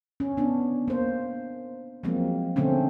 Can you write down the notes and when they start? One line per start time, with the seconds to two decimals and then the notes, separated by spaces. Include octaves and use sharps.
0.20 C#4
0.37 B3 D4
0.88 A#3 C5
2.03 F3 F#3 G#3 A#3 C4
2.56 B2 D3 A3 C4 C#4